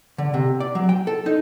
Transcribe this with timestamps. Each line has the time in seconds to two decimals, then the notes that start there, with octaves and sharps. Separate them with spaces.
0.18 D3
0.34 C3
0.60 D5
0.75 F#3
0.89 G5
1.07 A4
1.26 D#4